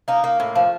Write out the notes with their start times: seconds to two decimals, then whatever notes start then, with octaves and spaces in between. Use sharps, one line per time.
0.08 A#3 D#4
0.24 A#3
0.40 A2
0.56 F3